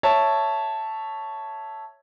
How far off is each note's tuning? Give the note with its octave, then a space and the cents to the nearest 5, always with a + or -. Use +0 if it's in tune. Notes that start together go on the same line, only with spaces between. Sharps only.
C#5 +0 E5 +0 A5 +0